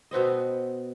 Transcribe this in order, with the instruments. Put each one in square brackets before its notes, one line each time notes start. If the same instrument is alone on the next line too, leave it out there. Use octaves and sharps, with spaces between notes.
[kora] B2 B3 C4 D#5